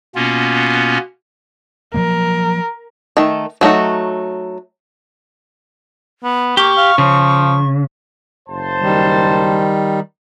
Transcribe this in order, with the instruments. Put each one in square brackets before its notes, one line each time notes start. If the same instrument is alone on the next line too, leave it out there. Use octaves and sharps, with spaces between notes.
[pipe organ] B2 A#3 B3 C#4 F4
[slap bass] F3 F#3 A#3 [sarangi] A#4
[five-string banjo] D#3 A3
F#3 A3 D#4 F#4
[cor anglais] B3
[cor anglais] A#3 [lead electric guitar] G4 [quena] C#6
[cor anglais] F5
[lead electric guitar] C#3 [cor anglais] F3
[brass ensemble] F#1 C5 A5
[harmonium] D#3 G3